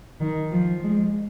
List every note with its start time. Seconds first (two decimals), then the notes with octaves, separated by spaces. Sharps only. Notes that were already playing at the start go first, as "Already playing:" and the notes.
0.20 D#3
0.52 F3
0.83 G#3